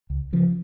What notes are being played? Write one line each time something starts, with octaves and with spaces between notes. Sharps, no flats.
C#2
C#3 F3